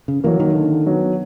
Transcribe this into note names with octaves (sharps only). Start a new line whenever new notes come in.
C#3
E3 F#3 A#3
D#3
D3
F#3 B3